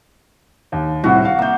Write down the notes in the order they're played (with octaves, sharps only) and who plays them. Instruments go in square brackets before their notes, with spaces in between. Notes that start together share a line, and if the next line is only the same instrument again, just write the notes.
[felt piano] D#2
[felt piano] C2 A2 C3 [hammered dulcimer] F#4
[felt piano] F5
[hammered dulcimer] A#3 [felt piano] E5 G6